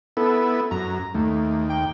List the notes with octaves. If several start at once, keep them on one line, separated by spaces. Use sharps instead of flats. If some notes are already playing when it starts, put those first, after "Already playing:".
B3 E4 A4
F#2 A#5
D#2 A3
G5